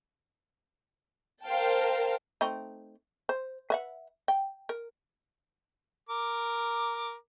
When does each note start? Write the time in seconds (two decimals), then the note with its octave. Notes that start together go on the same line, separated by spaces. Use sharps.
1.45 A#4 C5 F5 G5 A5
2.41 A3 C4 D#4
3.29 C5
3.70 B4 E5 F#5
4.28 G5
4.69 A#4
6.09 A#4 D6